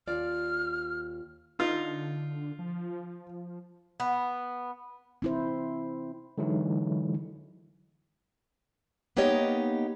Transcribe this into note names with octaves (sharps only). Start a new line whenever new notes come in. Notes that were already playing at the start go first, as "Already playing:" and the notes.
D#2 F4 D5 F6
D3 D#4 F4
F3
B3
C4 E4 C5
D3 E3 F#3 G#3 D#4 E4
A#3 B3 D#4 G4 C#5 D#5